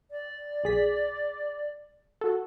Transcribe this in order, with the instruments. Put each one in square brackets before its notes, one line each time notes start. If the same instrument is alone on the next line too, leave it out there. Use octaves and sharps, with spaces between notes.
[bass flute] D5
[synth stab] B1 G#4 B6
F#4 A4